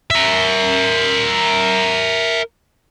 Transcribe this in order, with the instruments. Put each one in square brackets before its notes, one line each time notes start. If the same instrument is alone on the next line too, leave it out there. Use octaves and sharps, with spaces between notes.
[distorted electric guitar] A#4 E5